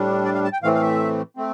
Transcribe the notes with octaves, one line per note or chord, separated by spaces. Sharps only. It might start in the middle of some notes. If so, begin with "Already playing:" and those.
Already playing: A2 G3 D4
D5
F5
A5
G5
A2 E3 A3 C4 F5
F5
E5
A3 C4